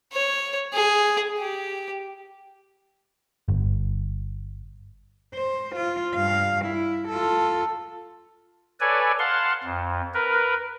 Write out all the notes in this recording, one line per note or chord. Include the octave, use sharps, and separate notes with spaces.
C#5
G#4
G4
G1
C5
F4
G2 F5
E4
F4 A4
A4 B4 C#5 D5 G#5
F5 F#5 A5 C6
F2
A#4 B4